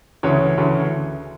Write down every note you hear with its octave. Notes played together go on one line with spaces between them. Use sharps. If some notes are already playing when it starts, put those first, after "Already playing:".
D2 C#3 E3 C#5
D2 C#3 E3